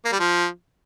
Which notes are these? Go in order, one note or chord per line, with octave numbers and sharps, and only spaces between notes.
A#3
G3
F3